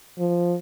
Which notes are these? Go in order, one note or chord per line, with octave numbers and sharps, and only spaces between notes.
F3